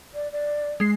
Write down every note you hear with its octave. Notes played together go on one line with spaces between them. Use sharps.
D5
D5
G#3 C7